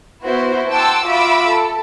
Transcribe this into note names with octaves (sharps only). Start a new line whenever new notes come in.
B3 E4 F#4 C5
F#5 G5 A5 C6 D6 E6
F4 F#4 E5 B5 D6 E6
A4